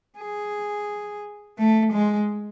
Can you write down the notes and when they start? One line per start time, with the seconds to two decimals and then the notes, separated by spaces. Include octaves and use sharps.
0.19 G#4
1.59 A3
1.93 G#3